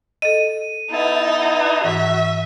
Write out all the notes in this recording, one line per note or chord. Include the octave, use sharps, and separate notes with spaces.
A4 D#5 D#7
B3 D#4 E4 A5
G#2 E3 F#4 E5